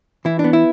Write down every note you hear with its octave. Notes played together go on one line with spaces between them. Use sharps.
E3 E4
D4
B3
E4